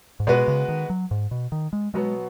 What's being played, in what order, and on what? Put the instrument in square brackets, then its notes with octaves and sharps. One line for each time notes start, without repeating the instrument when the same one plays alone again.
[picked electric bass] G#2
[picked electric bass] B2 [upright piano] G#3 B3 F#4 B4
[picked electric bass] C#3
D#3
F#3
G#2
B2
D#3
G#3
[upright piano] B2 F#3 B3 [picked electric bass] G#3